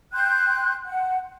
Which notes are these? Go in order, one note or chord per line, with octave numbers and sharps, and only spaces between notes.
G5 C6 F#6 G6
F#5